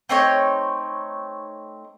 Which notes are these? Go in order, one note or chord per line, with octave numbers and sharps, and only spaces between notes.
A3 C4 D#4 C#5